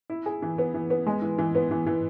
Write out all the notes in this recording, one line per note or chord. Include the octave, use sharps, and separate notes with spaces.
E4
G#4
E3
B3
E3
B3
G#3
E3
E3
B3
E3
E3